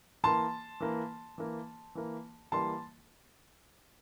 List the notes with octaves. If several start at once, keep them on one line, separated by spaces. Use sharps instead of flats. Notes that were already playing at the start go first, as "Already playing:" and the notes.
E3 A#3 A5 C6
E3 A#3
E3 A#3
E3 A#3
E3 G3 A#3 A5 C6